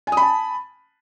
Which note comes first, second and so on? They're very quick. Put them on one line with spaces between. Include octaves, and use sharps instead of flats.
G#5 D#6 B5 A5